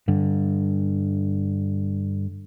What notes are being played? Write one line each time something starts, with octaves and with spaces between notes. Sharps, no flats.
G2 D3